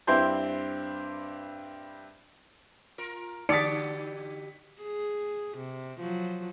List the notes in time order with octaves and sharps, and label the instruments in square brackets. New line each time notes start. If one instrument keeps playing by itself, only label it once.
[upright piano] G2 C4 E4 G4 C6 G6
[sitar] F4 A#4
[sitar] D3 F#4 G4 [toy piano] D#4 D#6 [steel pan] D5 [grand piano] B6 C#7
[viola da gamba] G#4
C3
F3 F#3